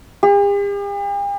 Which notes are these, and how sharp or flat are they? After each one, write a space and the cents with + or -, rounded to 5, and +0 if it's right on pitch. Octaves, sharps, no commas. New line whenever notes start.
G4 +45